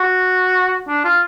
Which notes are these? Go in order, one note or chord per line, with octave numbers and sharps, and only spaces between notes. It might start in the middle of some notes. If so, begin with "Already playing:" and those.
Already playing: F#4
D4
F4